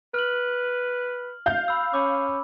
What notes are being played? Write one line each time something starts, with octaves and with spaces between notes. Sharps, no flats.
B4 F6 F#7
F5 G6
B5 E6
C#4 B5 D6